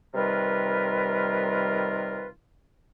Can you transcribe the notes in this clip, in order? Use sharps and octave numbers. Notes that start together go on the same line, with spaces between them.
C3 D#3 G3 F4 A#4 B4